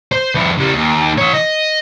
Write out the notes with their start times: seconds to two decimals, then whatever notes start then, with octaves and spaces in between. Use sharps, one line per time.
0.12 C5
0.35 F2 E4
0.58 C#3 G3
0.75 D#2
1.18 E3 C#5
1.34 D#5